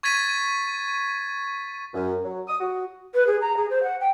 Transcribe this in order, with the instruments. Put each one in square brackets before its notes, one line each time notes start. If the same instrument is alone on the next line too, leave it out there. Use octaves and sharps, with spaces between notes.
[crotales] C#6 G#6 A6 B6 D#7
[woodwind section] F#2
F#3
D#6
F#4
[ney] B4
G#4
A#5
G#4
C5
F#5
G5